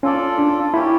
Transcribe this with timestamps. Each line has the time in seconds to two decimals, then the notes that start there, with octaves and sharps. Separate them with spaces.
0.03 C#4 F4 A4 D5
0.38 D4
0.73 A#3 C#4 E4 G4